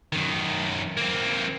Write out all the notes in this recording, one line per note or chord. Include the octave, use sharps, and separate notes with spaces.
F#2 D#3
A#3 C4